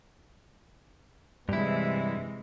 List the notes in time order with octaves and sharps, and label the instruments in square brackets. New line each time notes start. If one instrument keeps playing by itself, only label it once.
[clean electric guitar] G2 E4 [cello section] C3 E3 G#3